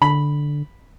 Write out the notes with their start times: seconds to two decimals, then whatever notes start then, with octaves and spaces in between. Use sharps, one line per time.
0.02 D3 B5